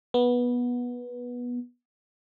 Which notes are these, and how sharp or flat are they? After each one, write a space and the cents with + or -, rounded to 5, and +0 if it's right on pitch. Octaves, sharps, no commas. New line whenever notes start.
B3 -15